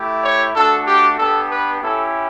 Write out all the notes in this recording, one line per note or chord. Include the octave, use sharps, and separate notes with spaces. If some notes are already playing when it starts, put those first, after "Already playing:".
Already playing: A3 E4 G4
C#5
A3 D4 F#4 A4
G4
B3 D4 G4 A4
B4
C#4 E4 G4 A4